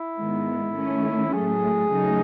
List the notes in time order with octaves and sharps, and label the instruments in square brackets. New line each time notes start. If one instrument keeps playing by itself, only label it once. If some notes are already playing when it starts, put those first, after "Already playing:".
Already playing: [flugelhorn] E4
[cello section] G#2 D#3 G#3 B3
D#3 A3 C#4
[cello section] A2 F#3 A3 [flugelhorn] G#4
[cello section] C#3 F#3 A3 D#4